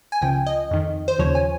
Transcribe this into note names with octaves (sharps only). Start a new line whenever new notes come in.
G#5
C#2 C#3 F3 G5
D#5
F2 D#3
C5
D#2 C#3 F3 C#5
G#5